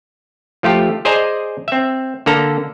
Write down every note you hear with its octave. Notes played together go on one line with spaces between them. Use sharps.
F3 A3 F4 G4
G#4 C5 D5 D#5 G#5 A#5
C4 E5
D3 A#3 A4 A#5